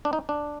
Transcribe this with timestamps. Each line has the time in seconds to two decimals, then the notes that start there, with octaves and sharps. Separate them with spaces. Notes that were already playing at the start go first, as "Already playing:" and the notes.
0.05 D4
0.13 D#4
0.29 D4